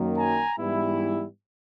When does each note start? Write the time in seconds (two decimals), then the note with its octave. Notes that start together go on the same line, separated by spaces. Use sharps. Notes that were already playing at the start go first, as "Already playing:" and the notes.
Already playing: F#2 D#3 F#3 A#3
0.17 G#5 A#5
0.58 G#2 E3 G3 B3 E4